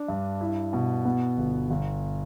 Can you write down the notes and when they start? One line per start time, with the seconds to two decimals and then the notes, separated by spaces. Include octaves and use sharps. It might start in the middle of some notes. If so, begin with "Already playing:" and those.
Already playing: D4
0.08 G2
0.41 E4
0.73 B2
1.05 B3
1.38 G1
1.70 G1